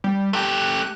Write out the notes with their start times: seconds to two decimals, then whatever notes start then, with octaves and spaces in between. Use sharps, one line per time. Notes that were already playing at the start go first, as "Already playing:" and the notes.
0.04 G3
0.33 A3 G4 F#6